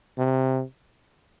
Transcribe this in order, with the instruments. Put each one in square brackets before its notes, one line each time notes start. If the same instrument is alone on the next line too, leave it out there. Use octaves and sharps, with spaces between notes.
[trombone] C3